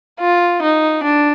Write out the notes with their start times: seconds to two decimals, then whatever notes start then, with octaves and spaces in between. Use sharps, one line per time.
0.20 F4
0.62 D#4
1.03 D4